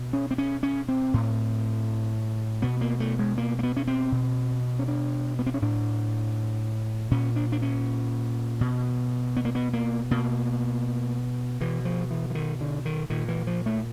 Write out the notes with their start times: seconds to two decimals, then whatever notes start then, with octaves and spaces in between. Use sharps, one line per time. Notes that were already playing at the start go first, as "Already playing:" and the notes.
Already playing: B2
0.13 C#4
0.31 C4
0.38 C#4
0.63 C#4
0.88 C4
1.14 A2
2.62 B2 B3
2.81 A#3
3.00 A3
3.19 G#3
3.38 A#3
3.59 A#3
3.63 B3
3.77 C#4
3.87 C4
4.12 B2
4.79 C#4
4.88 D4
5.39 B3
5.46 C4
5.54 C#4
5.62 A2 D4
7.11 A#2 C#4
7.36 D4
7.52 D4
7.62 C#4
8.61 B2
9.37 B3
9.45 A#3
9.55 B3
9.73 A#3
10.11 B2 A#3
11.61 B2 E3
11.85 F3
12.11 E3
12.30 E3
12.35 D#3
12.61 D3
12.85 D#3
13.10 A#2 D#3
13.28 E3
13.47 F3
13.66 A3